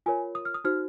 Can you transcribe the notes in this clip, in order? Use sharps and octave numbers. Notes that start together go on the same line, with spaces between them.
F4 A#4 C#5 G#5
D#6
F6
D#6
D#4 F#4 C5 F6